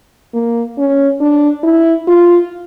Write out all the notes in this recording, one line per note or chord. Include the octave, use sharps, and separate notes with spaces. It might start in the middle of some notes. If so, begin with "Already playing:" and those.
A#3
C#4
D4
E4
F4